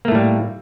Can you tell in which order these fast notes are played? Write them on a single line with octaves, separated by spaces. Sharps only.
A#3 A3 A2 G3